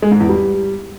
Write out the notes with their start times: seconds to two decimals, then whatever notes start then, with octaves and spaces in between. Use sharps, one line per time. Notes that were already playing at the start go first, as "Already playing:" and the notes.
0.02 G#3
0.11 G#2
0.20 E2
0.29 G3